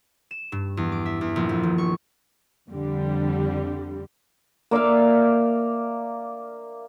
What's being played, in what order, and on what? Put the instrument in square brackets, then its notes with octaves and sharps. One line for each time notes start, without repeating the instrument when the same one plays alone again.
[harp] E7
G2
E2
D6
E5
E2
A#1
F2
D#1
C#6
[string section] F2 D3 G3
[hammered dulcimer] A#3 D5 E5 F5